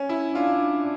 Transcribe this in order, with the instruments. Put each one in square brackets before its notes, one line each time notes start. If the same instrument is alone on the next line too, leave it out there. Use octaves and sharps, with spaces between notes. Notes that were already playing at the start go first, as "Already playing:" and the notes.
Already playing: [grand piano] C#4
E4
[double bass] D4 [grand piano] F4